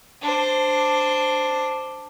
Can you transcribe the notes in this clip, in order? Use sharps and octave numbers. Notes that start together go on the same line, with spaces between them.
D4 C5